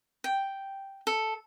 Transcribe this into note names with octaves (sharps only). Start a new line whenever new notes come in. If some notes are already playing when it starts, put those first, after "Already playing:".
G5
A4